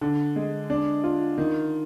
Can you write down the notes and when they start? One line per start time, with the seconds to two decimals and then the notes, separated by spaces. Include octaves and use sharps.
0.01 D3
0.36 G#3
0.70 D4
1.04 F4
1.38 D#3